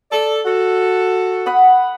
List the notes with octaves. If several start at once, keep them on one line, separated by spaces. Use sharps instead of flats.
A4 D5
F#4 A4
F#5 B5 D#6